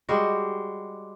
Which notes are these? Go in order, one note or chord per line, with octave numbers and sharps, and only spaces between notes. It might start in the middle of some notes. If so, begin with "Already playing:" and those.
G3 G#3 F#4